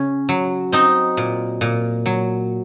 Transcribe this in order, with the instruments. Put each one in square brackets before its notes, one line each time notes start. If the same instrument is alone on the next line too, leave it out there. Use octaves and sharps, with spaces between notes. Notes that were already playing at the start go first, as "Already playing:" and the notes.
Already playing: [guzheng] C#3 C#4
F#3
C4 D#4
A#2
A#2
F#3